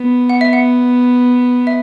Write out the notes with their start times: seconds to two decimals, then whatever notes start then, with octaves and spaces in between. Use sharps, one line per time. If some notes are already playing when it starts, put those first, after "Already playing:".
Already playing: B3
0.30 F#5
0.41 E5
0.53 F#5
1.67 E5